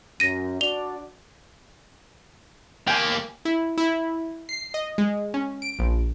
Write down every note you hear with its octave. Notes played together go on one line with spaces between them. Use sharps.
F#2 A#6 D#7
D4 F#4 D5 F7 G7
A#3 G4 G5 G#5
E4
E4
C7
D#5
G#3
C#4
D7
A#1